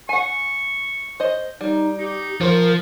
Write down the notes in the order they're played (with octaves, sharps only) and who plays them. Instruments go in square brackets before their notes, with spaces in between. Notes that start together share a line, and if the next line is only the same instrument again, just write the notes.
[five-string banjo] F#5 G#5 [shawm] C#6
[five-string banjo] C5 D#5
[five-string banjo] G3 [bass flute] D#4
[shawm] D#4 [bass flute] G4
[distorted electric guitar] F3 [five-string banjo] F4 C5 [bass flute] A#4